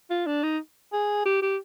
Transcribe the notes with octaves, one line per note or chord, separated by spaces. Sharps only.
F4
D4
D#4
G#4
G4
G4